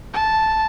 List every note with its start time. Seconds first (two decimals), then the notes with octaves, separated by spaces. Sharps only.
0.14 A5